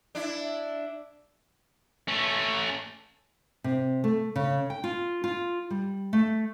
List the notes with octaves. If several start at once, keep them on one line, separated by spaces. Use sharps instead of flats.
D4 E4
A3 C#4
C3
A3
C#3
G5
F4
F4
G3
A3